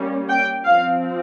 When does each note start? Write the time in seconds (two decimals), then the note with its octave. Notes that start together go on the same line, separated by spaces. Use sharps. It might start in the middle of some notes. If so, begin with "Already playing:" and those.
Already playing: G3 A#3 C#4
0.30 G5
0.65 F3 C4 F5